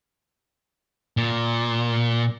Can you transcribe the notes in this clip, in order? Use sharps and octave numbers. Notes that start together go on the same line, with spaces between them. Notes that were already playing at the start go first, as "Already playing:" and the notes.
A#2